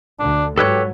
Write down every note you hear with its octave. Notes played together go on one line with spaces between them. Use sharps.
D2 D3 D4
G#2 F#3 G4 A4 B4 C#5